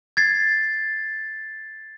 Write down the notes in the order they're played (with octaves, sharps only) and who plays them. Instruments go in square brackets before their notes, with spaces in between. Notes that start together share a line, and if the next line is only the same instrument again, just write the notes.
[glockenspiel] G#6 A6 C7